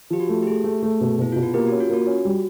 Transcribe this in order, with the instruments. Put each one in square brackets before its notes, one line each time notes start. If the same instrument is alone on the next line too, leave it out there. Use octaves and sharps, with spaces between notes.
[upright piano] F3 [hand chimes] G4
[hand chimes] F#4
[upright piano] A3
[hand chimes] G4
[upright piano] A3 [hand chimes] G#4
[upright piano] A3
A3
B2
[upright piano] B2 [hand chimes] E4
[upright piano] B2 [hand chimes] F4
[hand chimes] F#4
[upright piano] A#3 [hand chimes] G4
[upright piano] C#4 [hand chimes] F#4
[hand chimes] F4
[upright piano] A#3 [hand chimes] F#4
[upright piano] C#4
G3